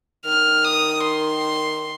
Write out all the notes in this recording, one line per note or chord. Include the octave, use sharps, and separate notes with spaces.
D#3 F6
D#6
C6